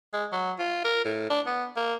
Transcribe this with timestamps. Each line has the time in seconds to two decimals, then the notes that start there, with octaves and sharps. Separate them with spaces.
0.13 G#3
0.32 F#3
0.59 F4
0.84 A#4
1.05 A2
1.30 D4
1.46 B3
1.76 A#3